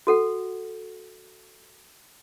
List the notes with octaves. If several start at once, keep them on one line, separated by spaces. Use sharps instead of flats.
F#4 A4 F#5